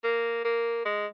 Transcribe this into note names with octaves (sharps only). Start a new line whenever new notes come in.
A#3
A#3
G#3